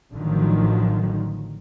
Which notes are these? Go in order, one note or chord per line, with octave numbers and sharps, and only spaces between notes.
A1 D3 D#3 F3 F#3